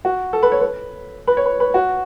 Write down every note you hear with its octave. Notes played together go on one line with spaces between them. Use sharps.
F#4
A4
B4
C#5
B4
B4
C#5
B4
B4
F#4